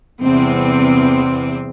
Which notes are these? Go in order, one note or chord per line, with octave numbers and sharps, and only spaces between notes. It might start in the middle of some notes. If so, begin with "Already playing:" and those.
E2 C3 G3 C4